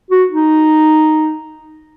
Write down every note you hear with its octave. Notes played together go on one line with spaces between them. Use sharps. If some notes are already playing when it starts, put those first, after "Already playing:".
F#4
D#4